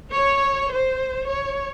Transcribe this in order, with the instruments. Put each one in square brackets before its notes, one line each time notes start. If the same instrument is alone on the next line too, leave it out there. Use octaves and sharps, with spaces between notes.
[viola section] C#5
C5
C#5